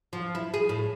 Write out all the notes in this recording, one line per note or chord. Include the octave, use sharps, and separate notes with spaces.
F3
E4
G#4
A2